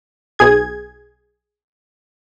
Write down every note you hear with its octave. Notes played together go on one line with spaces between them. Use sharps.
B1 G#4 G#6